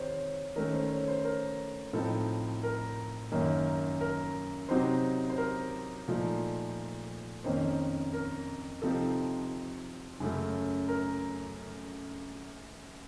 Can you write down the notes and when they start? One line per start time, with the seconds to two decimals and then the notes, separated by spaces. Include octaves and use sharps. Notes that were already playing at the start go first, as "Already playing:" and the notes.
Already playing: C3 D#3 C5 C#5
0.56 D#3 A3 C#4 A#4
0.73 C5
0.91 C#5
1.08 C5
1.25 A#4
1.93 A2 F3 C4 D#4 A4
2.63 A#4
3.32 F#2 D#3 A#3 C#4
4.01 A#4
4.69 C3 F#3 C4 D#4 C5
5.30 C5
5.38 A#4
6.08 A#2 F3 A3 D#4
7.44 F2 D#3 A#3 C#4 C5
8.13 A#4
8.82 C3 F3 C4 D#4 A4
10.20 F#2 C#3 A3
10.88 A#4